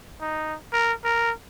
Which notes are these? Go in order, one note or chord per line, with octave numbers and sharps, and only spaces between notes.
D#4
A#4
A#4